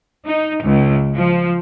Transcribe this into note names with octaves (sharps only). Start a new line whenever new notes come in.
D#4
C#2
F3